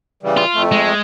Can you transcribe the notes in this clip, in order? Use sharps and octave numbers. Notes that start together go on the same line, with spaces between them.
C#3 E3 G3
F4
F2 A3
G#3